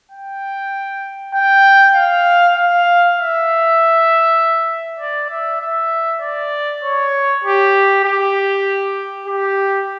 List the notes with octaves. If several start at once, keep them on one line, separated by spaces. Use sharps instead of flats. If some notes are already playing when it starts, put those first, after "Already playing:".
G5
G5
F5
F5
E5
D5
E5
E5
D5
C#5
G4
G4
G4